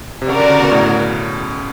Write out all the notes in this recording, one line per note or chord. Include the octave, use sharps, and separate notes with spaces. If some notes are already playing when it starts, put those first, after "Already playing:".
C3
C#3 F#4 A#4 D5
D3
C#3
B2
A2